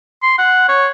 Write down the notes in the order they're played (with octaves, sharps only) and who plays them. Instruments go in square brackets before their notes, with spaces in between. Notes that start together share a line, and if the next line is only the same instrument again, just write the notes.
[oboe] C6
F#5
C#5